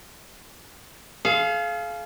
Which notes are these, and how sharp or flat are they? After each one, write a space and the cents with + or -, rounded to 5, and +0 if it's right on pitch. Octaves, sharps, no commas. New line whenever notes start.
G#4 +45 F5 -10